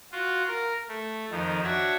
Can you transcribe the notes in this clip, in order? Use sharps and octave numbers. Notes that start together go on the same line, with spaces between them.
F4 F#4
A#4
A3
F2 D#3 F3
D4 F#4 C#5 E5